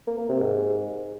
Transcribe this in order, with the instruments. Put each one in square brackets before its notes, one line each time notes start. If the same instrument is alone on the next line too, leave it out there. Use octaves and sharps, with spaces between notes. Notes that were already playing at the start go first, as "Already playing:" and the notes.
[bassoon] A#3
A#3
C3
G#2